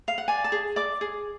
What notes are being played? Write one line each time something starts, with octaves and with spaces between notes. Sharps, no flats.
F5
F#5
D5 G#5
A5
G#4
D5 D6
G#4